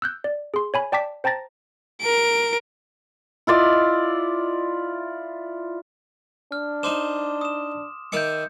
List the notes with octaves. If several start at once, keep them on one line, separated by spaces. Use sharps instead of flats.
E6 F#6 G6
D5
G#4 C6
C#5 G#5 B5
D5 G5 A5 D6 B6
C5 G5 A5 A#5 A6 A#6
A#4 D7
E4 F4 D5 D#5
D4 F6
D#4 C5 C6 D6 E7
D#6 E7
D#3 E5 D6 G6 C#7